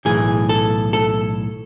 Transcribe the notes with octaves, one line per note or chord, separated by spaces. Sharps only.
B1 A2 E3 G#4
A4
A4